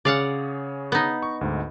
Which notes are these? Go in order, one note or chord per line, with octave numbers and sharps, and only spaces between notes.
C#3 G#4 C#5 D5 F5 F#5
B3 D#4
C#6
D2 G#2